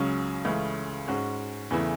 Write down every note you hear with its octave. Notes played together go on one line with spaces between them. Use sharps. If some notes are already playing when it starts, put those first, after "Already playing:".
Already playing: C#2 C#3 F#3 C#4
C#2 C#3 E3 A3 C#4
G#2 G#3 C#4 F#4
E2 C#3 E3 A3 E4